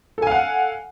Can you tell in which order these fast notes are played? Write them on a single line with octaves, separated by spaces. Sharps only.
A4 G#5 F5 F#5